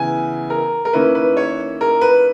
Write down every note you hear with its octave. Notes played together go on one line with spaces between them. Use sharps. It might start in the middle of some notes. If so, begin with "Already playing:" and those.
Already playing: C#3 E3 B3 E4 G#5
A#4
A#4
D#3 A#3 C#4 E4 B4
B4
C#5
A#4
B4